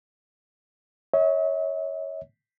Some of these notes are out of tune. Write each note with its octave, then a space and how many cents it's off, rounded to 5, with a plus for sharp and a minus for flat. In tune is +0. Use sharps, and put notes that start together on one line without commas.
C#5 +0 E5 -45